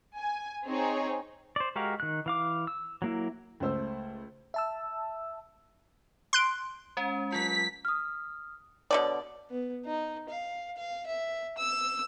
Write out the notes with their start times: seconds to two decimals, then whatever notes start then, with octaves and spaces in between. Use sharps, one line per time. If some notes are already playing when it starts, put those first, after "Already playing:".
0.18 G#5
0.66 C4 D#4 G#4 C#5
1.56 C5 D5
1.76 G#3 F#4 G4 A#4 F5
2.00 D#3 F#6
2.26 E3 F5 D6
2.67 E6
3.02 F#3 A#3 E4
3.60 C#2 A3 C5 E6
4.54 E5 A5 E6
6.33 C6 F#6 D7
6.97 G#3 C#4
7.32 F#3 F4 B6
7.85 D#6 F6
8.91 B2 D3 C#5 D5
9.50 B3
9.85 D#4
10.29 F5
10.77 F5
11.06 E5
11.57 E6